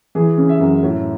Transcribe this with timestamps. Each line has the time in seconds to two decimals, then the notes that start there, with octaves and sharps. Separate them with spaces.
0.15 E3 G#4
0.37 C#3
0.49 E5
0.60 F#2
0.83 A2